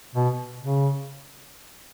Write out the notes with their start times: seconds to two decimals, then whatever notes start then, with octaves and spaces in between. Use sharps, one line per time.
0.15 B2
0.61 C#3